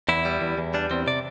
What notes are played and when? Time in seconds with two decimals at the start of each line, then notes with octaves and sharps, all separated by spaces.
0.09 E2 E4
0.25 G3
0.41 E2
0.57 E2
0.74 G3 D4
0.91 E2 C4
1.07 C3 D5